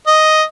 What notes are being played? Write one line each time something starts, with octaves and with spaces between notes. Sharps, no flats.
D#5